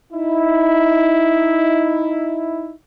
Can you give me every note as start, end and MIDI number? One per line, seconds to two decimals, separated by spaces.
0.13 2.72 63
0.13 2.72 64